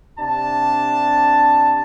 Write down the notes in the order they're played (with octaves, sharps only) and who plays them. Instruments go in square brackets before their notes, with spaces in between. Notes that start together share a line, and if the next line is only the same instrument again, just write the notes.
[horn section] C3 D4 A5